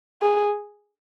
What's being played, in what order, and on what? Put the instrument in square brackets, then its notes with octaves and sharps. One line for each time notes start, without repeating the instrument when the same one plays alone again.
[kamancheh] G#4